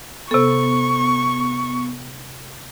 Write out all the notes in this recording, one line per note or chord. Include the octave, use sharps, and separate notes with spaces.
C3 B3 A4 C#6